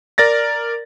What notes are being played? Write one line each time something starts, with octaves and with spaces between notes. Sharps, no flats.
A#4 D5 A6 A#6